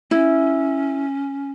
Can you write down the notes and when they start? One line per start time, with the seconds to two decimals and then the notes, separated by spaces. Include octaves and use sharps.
0.11 C#4 E4